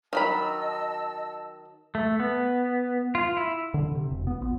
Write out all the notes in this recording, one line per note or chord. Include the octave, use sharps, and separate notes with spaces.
D#3 F#3 D#5 A5 B5 E6
A3
B3
F4
E4
D3
C3
E1
B3
A#1